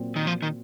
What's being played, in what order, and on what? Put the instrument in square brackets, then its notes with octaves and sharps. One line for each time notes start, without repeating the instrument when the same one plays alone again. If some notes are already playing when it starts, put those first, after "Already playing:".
Already playing: [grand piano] A#2 F#3 C4
[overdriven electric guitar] D#3
F3
D#3